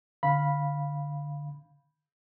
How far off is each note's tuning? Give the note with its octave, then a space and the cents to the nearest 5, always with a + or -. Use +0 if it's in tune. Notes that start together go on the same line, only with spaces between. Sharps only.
D3 +0 F5 +0 B5 -10